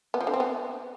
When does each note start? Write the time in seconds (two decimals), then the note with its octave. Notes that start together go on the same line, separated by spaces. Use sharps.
0.14 B3
0.21 F3
0.27 D3
0.34 C4
0.40 B3